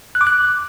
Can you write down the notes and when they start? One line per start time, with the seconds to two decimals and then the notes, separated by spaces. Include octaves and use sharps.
0.15 F#6
0.21 D6
0.27 F#6